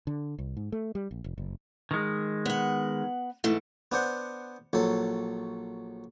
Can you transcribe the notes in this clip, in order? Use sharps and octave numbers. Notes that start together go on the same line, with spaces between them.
D3
C2
G#2
A3
G3
A#1
F1
F#1
D#3 G#3
B3 F#5
G#2 E3 A3
B3 D4 C5 F#5
A#1 F#3 A4